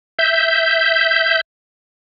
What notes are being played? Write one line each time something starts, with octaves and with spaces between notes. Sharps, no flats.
E5 G6